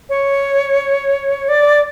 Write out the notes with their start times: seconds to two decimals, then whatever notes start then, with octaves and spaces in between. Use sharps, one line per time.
0.09 C#5
1.49 D5